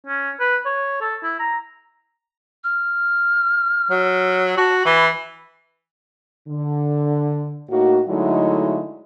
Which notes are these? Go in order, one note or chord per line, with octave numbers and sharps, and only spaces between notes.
C#4
B4
C#5
A4
E4
A#5
F6
F#3
F#4 A5
E3 B5
D3
A2 A#3 D#4 F#4
D3 F#3 G#3 A3 D#4 E4